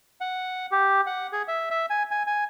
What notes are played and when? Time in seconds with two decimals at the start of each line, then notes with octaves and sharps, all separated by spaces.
0.21 F#5
0.72 G4
1.06 F#5
1.33 G#4
1.48 E5
1.71 E5
1.90 G#5
2.11 G#5
2.27 G#5